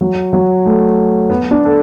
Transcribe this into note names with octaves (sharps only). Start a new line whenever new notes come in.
F#3
F#3
A3
B3
D4
A4